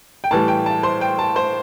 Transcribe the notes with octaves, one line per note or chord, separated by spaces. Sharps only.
G5
A2 E3 G3 A5
G5
A5
C5 C6
G5
A5
C5 C6